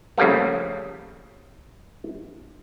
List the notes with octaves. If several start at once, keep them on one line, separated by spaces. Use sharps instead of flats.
C#3 F3 G3 A3 A#3